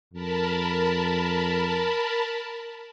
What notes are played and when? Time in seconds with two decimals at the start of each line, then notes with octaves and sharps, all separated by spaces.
0.13 F2 A#4 A5 B5